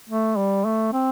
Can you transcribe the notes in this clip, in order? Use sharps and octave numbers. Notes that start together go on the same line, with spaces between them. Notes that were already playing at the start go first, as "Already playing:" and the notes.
A3
G3
A3
C4